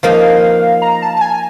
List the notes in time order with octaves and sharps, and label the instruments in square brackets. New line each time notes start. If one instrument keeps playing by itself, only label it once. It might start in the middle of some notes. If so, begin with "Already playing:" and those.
[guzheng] F3 A#3 D#4 [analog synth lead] F5
[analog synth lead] A#5
A5
A5
G#5